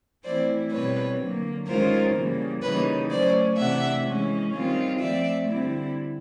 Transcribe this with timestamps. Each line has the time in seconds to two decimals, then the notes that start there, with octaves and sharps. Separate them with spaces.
0.23 E3 A3 C4 E4 C5 D5
0.71 B2 G3 C4 B4 C#5
1.19 D3 F#3 A#3
1.67 D#3 G#3 C#4 F4 A#4 C5
2.14 C#3 E3 G3 A#3
2.62 C#3 E3 G3 A#3 D#4 B4 C#5
3.09 F#3 A3 C#4 C5 D5
3.56 C3 E3 A3 D4 E5 F#5
4.04 E3 G#3 C#4
4.53 D#3 G3 C4 F4
5.00 F3 A3 C4 D5 E5
5.47 D3 G3 C4 E4